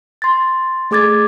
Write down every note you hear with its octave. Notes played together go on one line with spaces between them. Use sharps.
C6 A6
A3 G#4 D6 G#6 A6